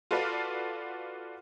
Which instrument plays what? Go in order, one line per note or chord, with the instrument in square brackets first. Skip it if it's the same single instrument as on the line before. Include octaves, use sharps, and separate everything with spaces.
[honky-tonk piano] F4 F#4 A4 B4 D5 F5